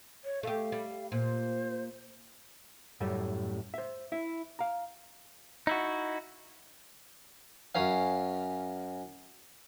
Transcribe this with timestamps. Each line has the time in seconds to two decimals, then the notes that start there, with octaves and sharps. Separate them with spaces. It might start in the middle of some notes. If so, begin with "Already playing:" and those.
0.24 C#5
0.43 A3 G4 F5
0.72 G3
1.12 A#2 C5
3.00 F#2 A2 G3 A3
3.74 C5 E5
4.12 E4 E5
4.59 F5 A#5
5.67 D#4 E4 F#4
7.75 F#2 C#4 F5